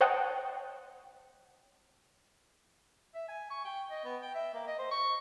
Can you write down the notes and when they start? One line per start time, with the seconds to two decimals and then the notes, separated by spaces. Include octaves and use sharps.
0.01 C5 C#5 D#5 F#5 G5 A5
3.15 E5
3.29 G#5
3.51 C#6
3.65 G5
3.90 D#5
4.05 B3
4.22 G5
4.35 E5
4.54 A#3
4.67 D#5
4.79 C5
4.91 C#6